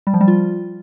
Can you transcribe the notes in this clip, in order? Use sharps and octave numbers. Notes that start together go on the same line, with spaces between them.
G3
F3
G3
F4